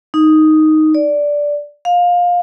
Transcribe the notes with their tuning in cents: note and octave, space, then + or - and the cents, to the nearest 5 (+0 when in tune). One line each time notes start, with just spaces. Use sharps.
D#4 +0
D5 -5
F5 +20